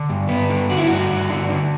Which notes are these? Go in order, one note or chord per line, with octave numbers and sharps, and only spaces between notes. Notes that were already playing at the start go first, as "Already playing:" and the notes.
Already playing: D3
G2
G2 B3
D3
D3 F#4
E4
G2 F#4
G2
D3
D3